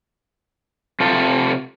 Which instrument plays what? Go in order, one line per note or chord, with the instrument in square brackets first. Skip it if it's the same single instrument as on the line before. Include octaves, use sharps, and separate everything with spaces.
[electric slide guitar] C3 F4 A4